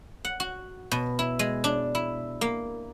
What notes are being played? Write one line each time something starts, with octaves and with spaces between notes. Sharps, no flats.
F#5
F#4
B2
E4
G#3
D4
E4
A#3